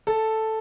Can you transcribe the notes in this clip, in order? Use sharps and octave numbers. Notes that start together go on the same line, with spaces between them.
A4